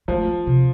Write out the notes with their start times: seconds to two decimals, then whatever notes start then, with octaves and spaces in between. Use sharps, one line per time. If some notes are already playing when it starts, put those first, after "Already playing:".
0.08 F3 A3
0.28 B3
0.47 C3